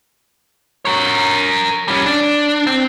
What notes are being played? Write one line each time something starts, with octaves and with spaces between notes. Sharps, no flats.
A#4 C#5
G3 C#4
D4
C4